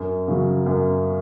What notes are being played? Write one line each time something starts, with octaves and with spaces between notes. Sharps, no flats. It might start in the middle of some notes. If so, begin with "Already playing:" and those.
Already playing: F#2
C#3 F#3
F#2